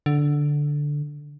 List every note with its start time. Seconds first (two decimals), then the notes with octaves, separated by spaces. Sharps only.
0.06 D3